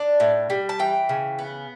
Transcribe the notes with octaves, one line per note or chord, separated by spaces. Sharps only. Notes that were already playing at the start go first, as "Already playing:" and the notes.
Already playing: D4 A5
A2
G3
A5
E3 G5
C#3
B3